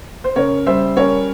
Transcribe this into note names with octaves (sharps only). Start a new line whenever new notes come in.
C5
C#3 A#4 C#5
G3 C5 E5
C#4 A#4 C#5